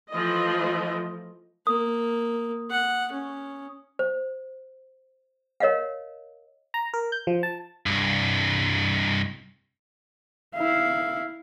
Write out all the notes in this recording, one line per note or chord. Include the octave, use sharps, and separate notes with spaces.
E3 F3 A3 D#5
A#3 D#6
F#5
C#4
C5
A#4 C#5 D#5 F5 F#5
A#5
A#4
G6
F3
A5
C2 G2
E4 F5